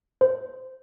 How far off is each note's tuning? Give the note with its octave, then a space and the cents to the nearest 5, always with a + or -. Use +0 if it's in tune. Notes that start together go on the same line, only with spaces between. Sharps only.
C5 -15